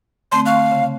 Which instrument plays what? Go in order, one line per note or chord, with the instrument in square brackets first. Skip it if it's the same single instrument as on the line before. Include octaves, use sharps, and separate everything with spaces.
[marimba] D3 A3 C4 [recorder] C6
[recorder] F5 [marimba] C#6 F#6
[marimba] C#3